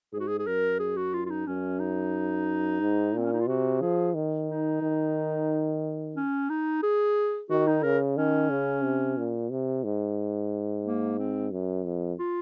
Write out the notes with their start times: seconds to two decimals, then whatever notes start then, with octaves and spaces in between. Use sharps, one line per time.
0.13 G#2 G#4
0.20 F#4
0.27 G#4
0.39 G#4
0.47 F#2 A#4
0.79 G#4
0.97 F#4
1.14 F4
1.26 F4
1.30 D#4
1.47 F#2 C#4
1.80 D#4
2.81 G#2
3.14 A#2 C4
3.25 C#4
3.33 D#4
3.40 F4
3.48 C3 F#4
3.81 F3 G#4
4.14 D#3
4.48 D#4
4.82 D#3
6.16 C#4
6.49 D#4
6.83 G#4
7.50 D#3 F#4
7.67 D#4
7.83 C#3 A#4
8.17 D#3 C#4
8.50 C#3
8.83 C3
9.17 A#2
9.50 C3
9.84 G#2
10.84 A#3
11.19 C4
11.51 F#2
11.85 F2
12.18 F4